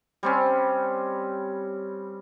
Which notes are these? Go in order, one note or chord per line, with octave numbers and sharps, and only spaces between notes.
G3 C4 C#4